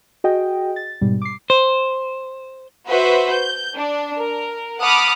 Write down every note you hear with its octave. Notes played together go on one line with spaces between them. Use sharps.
F#4 G#4 D#5 G5
A6
G#2 B2 G3
D6 C7
C5
F#4 B4 C5 E5
G6
D4
A#4
F#5 A5 B5 D6 D#6 F6